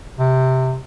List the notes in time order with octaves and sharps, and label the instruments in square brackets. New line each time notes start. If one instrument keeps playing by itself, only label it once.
[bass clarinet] C3